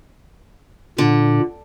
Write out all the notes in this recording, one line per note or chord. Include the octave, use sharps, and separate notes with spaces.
A#2 D3